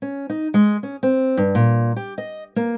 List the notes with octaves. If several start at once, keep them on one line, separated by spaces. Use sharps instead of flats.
C#4
D#4
G#3
C#4
C4
G2
A#2
G4
D#5
A#3